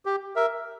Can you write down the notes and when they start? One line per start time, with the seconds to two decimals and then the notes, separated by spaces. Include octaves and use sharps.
0.06 G4
0.36 A#4 E5